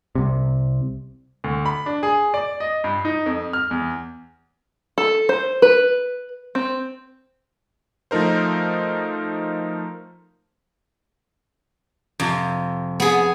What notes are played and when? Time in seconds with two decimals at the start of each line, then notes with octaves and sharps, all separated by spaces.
0.15 C2 C3
1.44 D2
1.66 B5
1.86 D4
2.03 G#4
2.34 D5
2.60 D#5
2.84 G2
3.05 D#4
3.26 F2
3.53 F6
3.71 E2
4.98 A4
5.29 C5
5.62 B4
6.55 C4
8.11 F3 A3 D#4 A#4 C5
12.20 F2 C3
13.00 B3 G#4